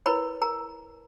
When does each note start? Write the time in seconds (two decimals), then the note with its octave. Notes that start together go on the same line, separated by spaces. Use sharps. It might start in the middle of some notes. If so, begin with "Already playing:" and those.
0.06 E4 A#4 B4 C#5 B5
0.41 A#4 A#5